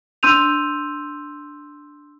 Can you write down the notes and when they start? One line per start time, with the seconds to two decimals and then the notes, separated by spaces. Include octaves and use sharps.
0.23 D4 C6 E6 G6 D#7 F7